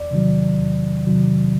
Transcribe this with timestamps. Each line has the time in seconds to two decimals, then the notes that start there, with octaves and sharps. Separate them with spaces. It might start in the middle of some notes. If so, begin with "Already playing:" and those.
Already playing: E2 D5
0.11 C3 D#3 F#3
0.59 E2
1.06 C3 D#3 F#3